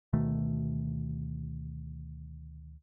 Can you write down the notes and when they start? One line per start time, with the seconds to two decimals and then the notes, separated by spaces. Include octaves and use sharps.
0.13 D2 B2 D#3 A3